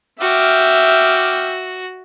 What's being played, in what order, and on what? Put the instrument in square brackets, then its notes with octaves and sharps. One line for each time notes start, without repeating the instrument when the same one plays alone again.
[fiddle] F#4 [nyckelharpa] E5 [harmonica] G5 D6 F6